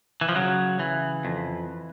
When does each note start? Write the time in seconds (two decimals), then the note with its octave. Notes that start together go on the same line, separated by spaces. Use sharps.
0.21 E3
0.29 F3
0.35 C#3 F#3
0.79 E3
1.25 F2